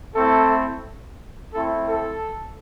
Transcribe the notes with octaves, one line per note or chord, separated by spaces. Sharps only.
A3 C4 E4 A4
A3 C4 E4 A4
A4